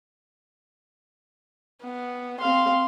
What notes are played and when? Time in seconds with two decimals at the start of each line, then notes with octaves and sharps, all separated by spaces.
1.84 B3
2.41 C4 F5 C6